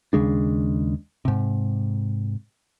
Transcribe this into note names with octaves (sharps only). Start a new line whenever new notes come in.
D#2 C#3 G#3 D4
G#2 C3